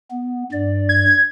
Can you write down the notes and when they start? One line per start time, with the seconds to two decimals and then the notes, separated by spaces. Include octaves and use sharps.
0.11 B3
0.52 G2 D5
0.89 G#6